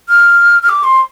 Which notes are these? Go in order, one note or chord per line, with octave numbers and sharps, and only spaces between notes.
F6
F6
D6
C6